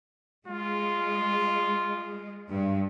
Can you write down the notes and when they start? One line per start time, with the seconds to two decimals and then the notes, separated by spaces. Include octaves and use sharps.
0.48 G#3 F4
2.50 G2